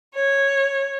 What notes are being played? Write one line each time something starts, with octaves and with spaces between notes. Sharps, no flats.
C#5